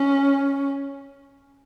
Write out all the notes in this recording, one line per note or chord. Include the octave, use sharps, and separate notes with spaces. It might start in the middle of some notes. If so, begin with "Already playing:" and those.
Already playing: C#4